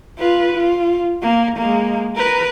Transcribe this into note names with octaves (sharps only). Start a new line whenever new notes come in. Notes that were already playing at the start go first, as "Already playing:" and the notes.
F4 B4
F4
A#3
G#3 A#3
A#4 B4